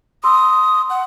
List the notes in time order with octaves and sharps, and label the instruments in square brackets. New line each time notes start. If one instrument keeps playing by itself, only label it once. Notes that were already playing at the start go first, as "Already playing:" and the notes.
[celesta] C6 E6 [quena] D#6
[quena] F#5